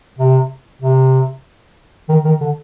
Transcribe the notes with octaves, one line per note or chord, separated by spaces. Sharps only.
C3
C3
D#3
D#3
D3